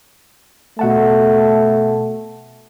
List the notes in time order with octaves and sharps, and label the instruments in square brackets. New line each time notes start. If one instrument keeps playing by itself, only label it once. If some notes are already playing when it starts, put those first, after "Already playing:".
[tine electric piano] B2 F#5 A5 [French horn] A3